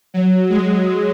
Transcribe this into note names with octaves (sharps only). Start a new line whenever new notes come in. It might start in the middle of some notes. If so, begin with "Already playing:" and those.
F#3
G#3